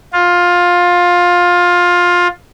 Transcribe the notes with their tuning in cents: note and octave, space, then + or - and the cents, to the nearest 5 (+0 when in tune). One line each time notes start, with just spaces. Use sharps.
F4 +15